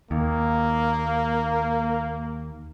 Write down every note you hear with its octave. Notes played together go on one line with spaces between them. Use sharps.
D#2 A#3